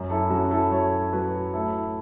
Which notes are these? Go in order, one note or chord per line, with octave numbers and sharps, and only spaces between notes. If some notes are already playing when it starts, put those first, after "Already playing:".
Already playing: F#2
E4 A4
F#3 C#4 F#4
E4 A4
F#3 A4 C#5
F#3 F#4 B4
A2 E4 A4